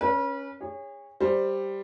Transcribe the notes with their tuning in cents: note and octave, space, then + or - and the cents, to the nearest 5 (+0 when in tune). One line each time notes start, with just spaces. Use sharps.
C#4 +0 B4 -35
G#4 -35 C#5 +0
G3 +0 C5 +0